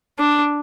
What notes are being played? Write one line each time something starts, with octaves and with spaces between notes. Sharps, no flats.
D4